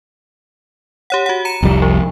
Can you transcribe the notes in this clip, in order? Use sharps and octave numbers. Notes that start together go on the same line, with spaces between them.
G4 C#5 F#5
F#4 F#5
A#5 C#7 E7
F1 C2 G3
F3